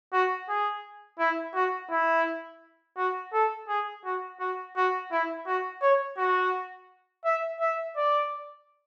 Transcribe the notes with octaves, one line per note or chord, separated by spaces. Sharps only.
F#4
G#4
E4
F#4
E4
F#4
A4
G#4
F#4
F#4
F#4
E4
F#4
C#5
F#4
E5
E5
D5